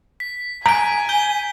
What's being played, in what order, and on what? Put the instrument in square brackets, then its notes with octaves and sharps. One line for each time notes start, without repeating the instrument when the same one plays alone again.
[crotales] B6
[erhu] G#5 [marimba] A#5 [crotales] B6 D7
[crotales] G6 G7